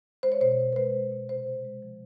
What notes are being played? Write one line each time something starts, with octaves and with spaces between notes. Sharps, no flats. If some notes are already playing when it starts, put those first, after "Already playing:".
G#3 C5
C#5
B2 C5
B2
B4
G#3 C5
G#3
B2
C3 C5
C3
G#3
F3